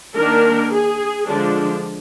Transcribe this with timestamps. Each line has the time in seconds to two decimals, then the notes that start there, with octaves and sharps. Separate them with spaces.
0.16 D#3 A#3 D4 A#4
0.73 G#4
1.27 D3 F3 G#3 D4